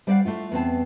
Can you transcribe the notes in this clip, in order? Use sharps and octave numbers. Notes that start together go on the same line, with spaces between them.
G3 C5 D5 D#5 F5 F#5
A3 E4 F4
E2 B3 C4 A5